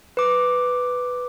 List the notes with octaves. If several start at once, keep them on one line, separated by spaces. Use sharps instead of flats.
B4 D6